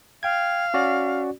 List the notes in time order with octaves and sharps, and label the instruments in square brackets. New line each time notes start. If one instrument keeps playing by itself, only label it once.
[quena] F5 [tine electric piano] G5 G#6
[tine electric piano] C#4 F#4 D5